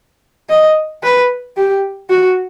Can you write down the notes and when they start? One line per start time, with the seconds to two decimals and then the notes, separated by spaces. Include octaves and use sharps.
0.50 D#5
1.03 B4
1.57 G4
2.10 F#4